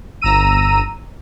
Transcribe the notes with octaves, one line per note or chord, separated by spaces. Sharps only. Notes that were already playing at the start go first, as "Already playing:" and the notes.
G1 A#5 E6 D#7